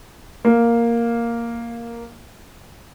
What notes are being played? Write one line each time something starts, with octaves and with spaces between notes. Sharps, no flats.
A#3 F5